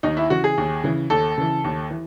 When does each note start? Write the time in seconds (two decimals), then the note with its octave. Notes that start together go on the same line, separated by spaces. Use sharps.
0.03 D#2 D#4
0.17 E4
0.30 C#3 E3 F#4
0.44 G#4
0.58 D#2
0.84 C#3 E3
1.10 D#2 A4
1.38 C#3 E3
1.64 D#2
1.91 E3